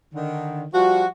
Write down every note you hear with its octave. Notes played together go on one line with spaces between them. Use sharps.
D3 D#3
F3 G3 F#4